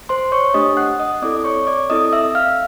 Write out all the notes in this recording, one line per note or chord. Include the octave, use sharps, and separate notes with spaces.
C5 C6
C#5 C#6
A3 D4 G4 D#5 D#6
F#5 F#6
D#5 D#6
C4 E4 A4 D5 D6
C#5 C#6
D5 D6
C4 E4 A4 D#5 D#6
E5 E6
F5 F6